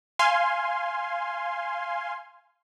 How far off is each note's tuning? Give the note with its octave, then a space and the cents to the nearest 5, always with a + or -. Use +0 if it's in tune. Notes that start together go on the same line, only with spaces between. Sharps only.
F5 -10 G#5 +0 C6 +0